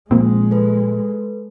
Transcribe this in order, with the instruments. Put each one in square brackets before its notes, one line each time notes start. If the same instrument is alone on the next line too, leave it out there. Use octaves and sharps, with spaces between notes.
[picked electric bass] A#2 F3 [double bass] G#3 [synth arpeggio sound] A#3 C4
[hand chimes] A4 B4